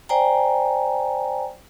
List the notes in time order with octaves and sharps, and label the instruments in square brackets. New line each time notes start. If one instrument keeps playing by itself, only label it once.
[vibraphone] C5 D5 G5 G#5 A#5